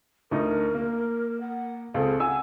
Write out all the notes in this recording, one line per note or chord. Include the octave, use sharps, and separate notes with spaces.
D2 D#4 A#4
A#3
F#5
C#2 C4 G#4 A4
F#5 G#5 E6